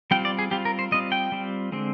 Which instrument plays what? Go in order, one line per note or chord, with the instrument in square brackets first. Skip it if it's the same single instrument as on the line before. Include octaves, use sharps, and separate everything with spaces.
[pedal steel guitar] G3 C4 F4 G5
D5
G#4
G3 C4 F4 G4
A#4
C5
G3 C4 F4 D#5
G5
G3 C4 F4
D3 G#3 C4